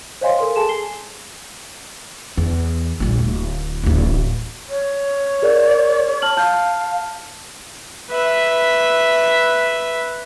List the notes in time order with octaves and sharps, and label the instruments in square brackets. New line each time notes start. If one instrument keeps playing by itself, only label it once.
[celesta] C5 C#5 D#5 F5 G#5 C6
A4 A#4 C6
G#4 A4 G#5 A5 C6 E7
G#5 C7 G7
[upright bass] E2
A#1 G3
D1
D1 A1
[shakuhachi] C#5
[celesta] G#4 A#4 D5
A5 F6 F#7
[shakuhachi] F5 [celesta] A5 F6 G6
[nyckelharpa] B4 E5